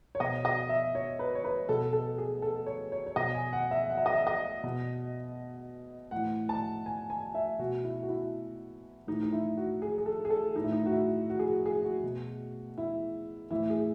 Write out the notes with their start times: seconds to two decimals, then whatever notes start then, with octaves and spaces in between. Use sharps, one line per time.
0.15 C#5
0.20 B2 D#5
0.45 D#5
0.69 E5
0.95 C#5
1.19 B4
1.35 C#5
1.44 B4
1.69 B2 A4
1.93 A4
2.18 G#4
2.42 A4
2.66 C#5
2.92 C#5
3.07 C#5
3.16 B2 D#5
3.35 G#5
3.53 F#5
3.71 E5
3.90 F#5
3.97 E5
4.06 D#5
4.14 E5
4.27 D#5
4.63 B2
6.11 A2 E3 F#5
6.49 A5
6.86 G#5
7.10 G#5
7.35 E5
7.59 B2 F#4
7.84 E4
8.03 F#4
8.09 E4
9.07 A2 E3 D#4
9.23 D#4
9.33 E4
9.57 F#4
9.82 G#4
9.98 G#4
10.06 A4
10.25 G#4
10.30 A4
10.55 E3 D#4
10.60 A2 E4
10.72 D#4
10.86 F#4
10.92 E4
11.30 F#4
11.39 G#4
11.48 F#4
11.66 G#4
11.85 F#4
12.03 B2
12.78 E4
13.50 A2 E3 E4
13.70 G#4